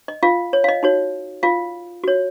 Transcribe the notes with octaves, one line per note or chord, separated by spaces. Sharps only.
D#5
F4 F5
C#5
F5
D#5
D#4 F#4 C#5
F4 F5
F#4 C#5